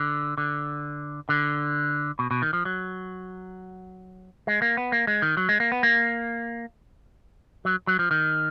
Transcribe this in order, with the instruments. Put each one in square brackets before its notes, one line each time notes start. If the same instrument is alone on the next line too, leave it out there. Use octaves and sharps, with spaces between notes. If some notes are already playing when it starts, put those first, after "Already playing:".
Already playing: [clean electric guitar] D3
D3
D3
B2
B2
D#3
F3
F#3
G#3
A#3
B3
A#3
G#3
D#3
F#3
G#3
A#3
B3
A#3
F#3
F#3
F3
D#3